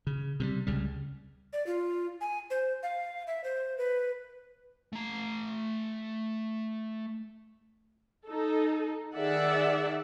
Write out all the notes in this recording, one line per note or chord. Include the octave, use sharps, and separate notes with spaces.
C#3
C3 E3 G3
C#2 C#3 G3
D5
F4
G#5
C5
F5
E5
C5
B4
A3 A#5
D#4 A4
D#3 G#4 D5 E5 F#5